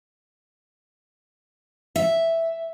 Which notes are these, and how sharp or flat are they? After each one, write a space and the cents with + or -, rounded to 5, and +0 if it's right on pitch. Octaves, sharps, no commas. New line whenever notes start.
E5 +0